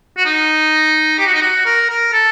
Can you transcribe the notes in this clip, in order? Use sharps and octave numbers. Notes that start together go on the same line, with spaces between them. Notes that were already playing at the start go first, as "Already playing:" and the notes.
F#4
D#4
G4
F#4
D#4
F#4
A#4
A#4
A4